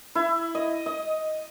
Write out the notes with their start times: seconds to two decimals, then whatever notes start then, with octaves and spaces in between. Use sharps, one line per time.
0.15 E4
0.55 D#5
0.86 D#5